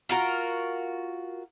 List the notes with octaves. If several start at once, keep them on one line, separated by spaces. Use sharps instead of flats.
F4 F#4 A#4